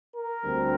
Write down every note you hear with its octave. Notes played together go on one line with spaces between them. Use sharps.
A#4
D2 D3 G3 C4